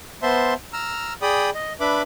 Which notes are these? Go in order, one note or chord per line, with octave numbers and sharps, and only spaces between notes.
B3 C5 E5 A5 C6
A#5 E6 F6
G#4 D5 G5 B5 D#6
D#5
D4 B4 E5 B5 D6